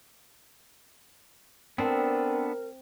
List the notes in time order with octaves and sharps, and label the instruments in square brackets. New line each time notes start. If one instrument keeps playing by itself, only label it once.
[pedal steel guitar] B3 D4 A4 [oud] C4 [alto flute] A#4